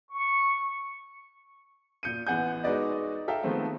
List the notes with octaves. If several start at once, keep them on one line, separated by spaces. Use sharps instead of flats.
C#6
A#2 G6 C#7 D#7
A1 B3 F#5 G#5 G6
G#3 D#4 F#4 B4 D5 D#5
A4 E5 F5 G5 A#5
D#3 F3 G#3 A3 B3 C4